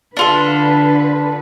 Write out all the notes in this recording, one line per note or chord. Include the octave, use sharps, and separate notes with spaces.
D3 D4 F4 A4 B4